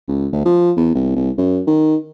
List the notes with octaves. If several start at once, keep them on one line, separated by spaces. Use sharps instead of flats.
C#2
D2
F3
E2
C2
C2
F#2
D#3